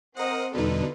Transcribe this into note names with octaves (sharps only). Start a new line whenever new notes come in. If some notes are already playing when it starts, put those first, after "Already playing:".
C4 A#4 C5 D#5 F#5 D#6
E2 B2 D3 G3 D#4 F4 A4 B4